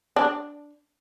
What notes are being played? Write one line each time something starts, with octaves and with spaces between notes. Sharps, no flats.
D4